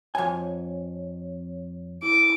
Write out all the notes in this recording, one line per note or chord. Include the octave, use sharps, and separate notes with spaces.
F2 C#5 G#5
E4 D6